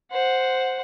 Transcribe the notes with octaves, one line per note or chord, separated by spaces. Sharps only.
C5 F#5